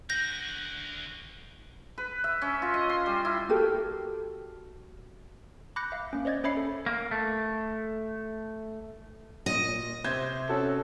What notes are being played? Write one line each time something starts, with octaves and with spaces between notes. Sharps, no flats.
D3 F#4 G6 A#6
B4
E5
C#4
F4
D#5
C6
G3
E4
F#4 G4 A4 A#4
B5 D6 F#6 G6 A#6 C#7
E5 F5
A#3 C#4
C5 D5 D#5 G#6 A6
C#4 C#5 E5 B5 C7 C#7
A4
A#3
A3
A#2 D#5
C3 C5 E5 G6 G#6
C#4 F#4 A4 C#5